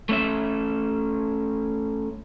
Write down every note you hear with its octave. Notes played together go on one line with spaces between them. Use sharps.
A3 C#4 E5